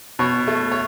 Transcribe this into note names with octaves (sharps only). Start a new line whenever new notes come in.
B2 C#5
A3
C#5